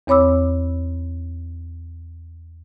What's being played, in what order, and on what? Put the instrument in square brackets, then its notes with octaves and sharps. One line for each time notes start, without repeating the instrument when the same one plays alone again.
[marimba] E2 C4 C#5 B5 D6 E6